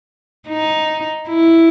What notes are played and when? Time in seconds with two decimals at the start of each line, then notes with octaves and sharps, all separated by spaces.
0.48 D#4
1.29 E4